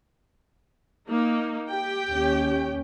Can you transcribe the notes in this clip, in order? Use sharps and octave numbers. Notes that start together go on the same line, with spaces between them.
A#3 D#4
G4 G5
D#2 C#4